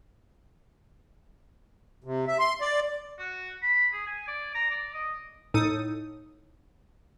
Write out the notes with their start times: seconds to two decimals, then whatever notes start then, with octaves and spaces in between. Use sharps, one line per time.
2.04 C3
2.28 E5
2.39 C6
2.61 D5
3.19 F#4
3.62 B5
3.93 G#4
4.06 G#5
4.28 D5
4.55 A#5
4.71 D5
4.94 D#5
5.54 A2 D#4 A4 D#6 D#7